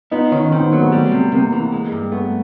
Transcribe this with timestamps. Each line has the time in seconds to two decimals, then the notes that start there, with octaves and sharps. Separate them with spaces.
0.11 B3 D#4 F4
0.32 D#3 C#4 D#4
0.52 D#3 C4
0.61 B3
0.71 F#3 A#3
0.80 A3 B3
0.92 G3
1.12 C3
1.32 C3 A#3
1.52 E3
1.72 G#3
1.92 G2
2.12 A3 B3